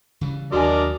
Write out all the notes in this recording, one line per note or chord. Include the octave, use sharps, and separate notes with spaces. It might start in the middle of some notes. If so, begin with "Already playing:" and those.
C#3 E3 G3
D#2 F#3 D4 F#4 A#4 D5 D#5 G#5